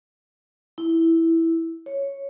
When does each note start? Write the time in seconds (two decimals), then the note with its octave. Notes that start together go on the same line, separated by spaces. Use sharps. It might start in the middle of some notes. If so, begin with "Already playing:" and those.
0.78 E4
1.86 C#5